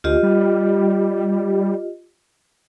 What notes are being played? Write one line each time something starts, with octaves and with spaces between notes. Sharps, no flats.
D2 F4 G4 D#5
G3